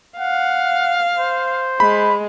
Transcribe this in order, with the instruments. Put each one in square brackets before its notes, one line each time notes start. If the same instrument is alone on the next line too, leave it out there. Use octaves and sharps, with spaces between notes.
[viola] F5 [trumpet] F#5
[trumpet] C5
[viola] G#3 [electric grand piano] B5